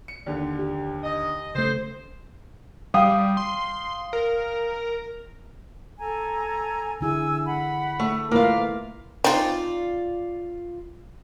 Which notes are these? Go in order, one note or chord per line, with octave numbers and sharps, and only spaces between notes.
C#7
D#2 D3
G4
D#5
C#3 A3 C5
G3 F5 G5 D#6
C6
A#4
A4 G#5 A#5
D3 E4 G#4 G#5 E6
F#5 B5
A3
A3 A#3 E4 F4 B4 F5
C4 D#4 F4 D5